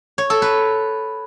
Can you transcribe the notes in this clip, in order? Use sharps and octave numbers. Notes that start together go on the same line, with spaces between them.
C#5
A4
B4